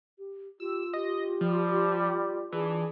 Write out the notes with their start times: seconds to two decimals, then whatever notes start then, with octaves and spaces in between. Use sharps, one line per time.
0.19 G4
0.60 F4 G4 E6
0.94 G4 D#5
1.41 F3 G3
2.52 E3 D4 G#4